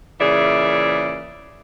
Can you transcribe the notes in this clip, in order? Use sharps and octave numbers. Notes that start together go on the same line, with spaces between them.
A#2 C#3 E3 G#4 D5 E5